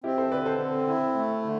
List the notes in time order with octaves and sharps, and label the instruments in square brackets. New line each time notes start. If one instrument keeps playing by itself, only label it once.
[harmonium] C4 [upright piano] E4 G4
[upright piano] A4 C5
[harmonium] D3 [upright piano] B4 D5
[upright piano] A4 C5
[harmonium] C4
E4
A3
D3